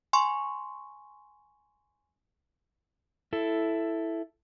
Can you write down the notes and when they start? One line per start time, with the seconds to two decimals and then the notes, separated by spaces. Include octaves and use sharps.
0.13 G#5 C6 C#6
3.33 E4 A4